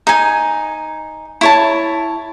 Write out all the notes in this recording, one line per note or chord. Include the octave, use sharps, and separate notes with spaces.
D#4 G#5
E4 C#5 A5